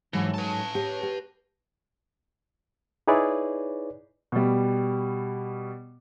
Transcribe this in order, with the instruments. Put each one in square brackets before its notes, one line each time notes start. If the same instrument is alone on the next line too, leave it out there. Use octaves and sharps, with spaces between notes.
[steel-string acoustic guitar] G#2 F#3 A4 [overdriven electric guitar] E3
[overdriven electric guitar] B4 A5
[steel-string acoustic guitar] G4 C#5
G4
[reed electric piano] D#4 E4 G#4 B4 C#5 D5
[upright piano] B2 G3